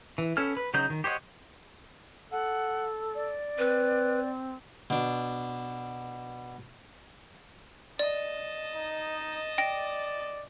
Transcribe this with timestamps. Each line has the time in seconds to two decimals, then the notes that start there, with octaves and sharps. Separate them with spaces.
0.18 E3
0.37 B3 C#4 A4 G#5 F6
0.57 B4
0.74 C#3 F#3 D#4 G6
0.90 D#3
1.04 G4 C5 C#5 D#5 F#5
2.32 A4 F#5
3.15 D5
3.59 C4 B4
4.90 B2 D4
7.99 D5 D#5 A5
8.75 D#4
9.58 D5 G5 A#6